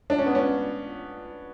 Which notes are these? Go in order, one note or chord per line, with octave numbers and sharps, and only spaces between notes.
D4
C#4
B3
C#4